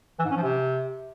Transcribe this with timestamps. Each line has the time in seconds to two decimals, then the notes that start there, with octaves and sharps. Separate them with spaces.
0.19 E3
0.25 G#2
0.31 C#4
0.37 F3
0.43 C3